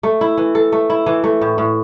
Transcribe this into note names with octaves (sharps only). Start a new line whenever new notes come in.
A3
E4
E3
A4
A3
E4
E3
A3
A2
A2